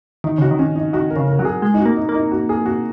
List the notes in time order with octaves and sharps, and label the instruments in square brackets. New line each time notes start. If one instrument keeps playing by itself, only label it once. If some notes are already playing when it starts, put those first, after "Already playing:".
[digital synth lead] D#3 [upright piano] D#4
[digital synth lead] C#3 [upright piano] F#4
[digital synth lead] D#3
[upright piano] C#4
D#4
[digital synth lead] D#3 [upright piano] F#4
[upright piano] A#4
[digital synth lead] C#3
[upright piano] A#4
[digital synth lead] F#3 [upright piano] F#4
[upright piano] G#4
[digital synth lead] G#3
[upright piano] D#4
F#4
[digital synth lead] A#3
[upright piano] D#4
[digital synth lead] A#3
[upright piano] D#4
F#4
G#4
F#4